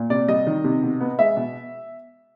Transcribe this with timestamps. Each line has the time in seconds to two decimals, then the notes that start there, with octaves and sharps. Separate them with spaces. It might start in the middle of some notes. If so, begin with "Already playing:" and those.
Already playing: A#2
0.10 C3 D5
0.28 G3 D#5
0.47 D#3
0.64 C3
0.83 B2
1.01 B3
1.19 G#3 E5
1.37 B2